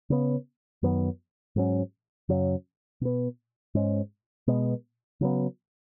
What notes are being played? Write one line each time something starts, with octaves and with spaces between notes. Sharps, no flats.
C#3 B3
F#2 D#3 F#3 B3
G#2 F#3 C#4
F#2 C#3 F#3 C#4
B2 B3
G#2 G#3 C#4
B2 G#3 B3
C#3 F#3 B3